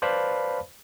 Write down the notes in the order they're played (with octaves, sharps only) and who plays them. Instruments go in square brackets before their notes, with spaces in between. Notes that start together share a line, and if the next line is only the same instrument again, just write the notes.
[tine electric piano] B4 C5 D5 F5 A5 B5